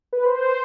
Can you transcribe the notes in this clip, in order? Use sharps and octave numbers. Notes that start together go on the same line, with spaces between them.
B4
C5